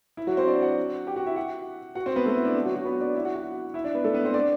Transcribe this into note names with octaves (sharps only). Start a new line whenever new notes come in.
E4
F#3 F#4
C4 C5
D4 D5
F#4 F#5
G4 G5
F#4 F#5
E4 E5
F#4 F#5
F#4 F#5
C4 C5
B3 B4
A3 A4
E4
D4
F#3 F#4
F#3 F#4
B3 B4
D4 D5
E4 E5
F#4 F#5
F#4 F#5
E4 E5
D4 D5
B3 B4
A3 A4
B3 B4
C4 C5
D4 D5